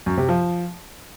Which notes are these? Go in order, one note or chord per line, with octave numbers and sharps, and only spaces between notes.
F#2
C3
F3